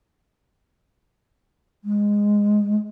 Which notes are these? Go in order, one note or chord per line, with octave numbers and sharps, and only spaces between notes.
G#3